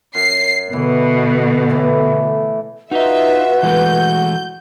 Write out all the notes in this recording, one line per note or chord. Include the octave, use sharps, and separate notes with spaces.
F#2 C7
B2 D3 E3
A2 E3
D#4 F4 F#4 B4 D#5 E5
E3 G#3 A3 G6